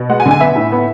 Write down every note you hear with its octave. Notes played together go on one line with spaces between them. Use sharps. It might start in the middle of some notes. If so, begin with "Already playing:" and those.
Already playing: B2
G#3 F#5
G#5
D3
G#5
B3 E5
A2
B3